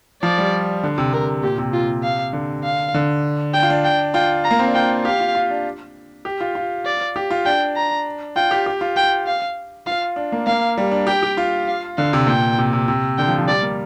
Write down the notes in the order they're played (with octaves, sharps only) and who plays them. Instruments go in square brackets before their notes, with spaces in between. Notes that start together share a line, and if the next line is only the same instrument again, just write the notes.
[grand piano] F3 [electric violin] D5
[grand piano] G3
D3
C3
[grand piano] C3 [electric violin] A#4
[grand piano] A#2 [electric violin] G4
[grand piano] C3
[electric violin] F4
F5
[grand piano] D3
[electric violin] F5
[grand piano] D3
[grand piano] D4 [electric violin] G5
[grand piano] F4
D4
[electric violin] G5
[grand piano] F4 [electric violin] G5
[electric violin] A#5
[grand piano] A#3
C4
D4
[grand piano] F4 [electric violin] G5
[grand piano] G4 [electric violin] F5
[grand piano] F4
F4
D4
G4
F4
F4
[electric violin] D5
[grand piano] G4
F4
[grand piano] D4 [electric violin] G5
[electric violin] A#5
[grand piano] F4 [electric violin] G5
[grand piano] G4
G4
F4
[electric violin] G5
F5
[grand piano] F4 [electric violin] F5
[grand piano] D4
A#3
[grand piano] A#3 [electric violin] F5
[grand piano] G3
D4
[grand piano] G4 [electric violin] G5
[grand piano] G4
F4
[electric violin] F5
[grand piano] D3 [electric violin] F5
[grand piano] C3
[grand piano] A#2 [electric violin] G5
[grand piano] C3
C3
C3
[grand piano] D3 [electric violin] G5
[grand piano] F3
F3
[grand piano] G3 [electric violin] D5
[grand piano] A#3